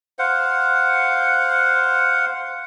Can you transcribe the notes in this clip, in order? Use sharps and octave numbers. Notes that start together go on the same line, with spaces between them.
C5 F5 F#5